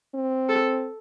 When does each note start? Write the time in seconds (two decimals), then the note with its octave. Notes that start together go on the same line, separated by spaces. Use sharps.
0.15 C4
0.49 A4